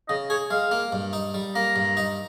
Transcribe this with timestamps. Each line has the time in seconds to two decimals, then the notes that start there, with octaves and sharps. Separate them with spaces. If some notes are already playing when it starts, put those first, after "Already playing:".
0.08 C#3 D#5
0.29 G#4 C#5
0.51 G#3 F5
0.71 A#3
0.92 G2
1.13 D#4
1.34 G3
1.55 A#3 A#5
1.76 G2
1.97 D#4